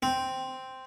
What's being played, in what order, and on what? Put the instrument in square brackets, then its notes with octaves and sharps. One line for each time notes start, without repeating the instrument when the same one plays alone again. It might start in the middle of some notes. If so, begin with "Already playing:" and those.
[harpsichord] C4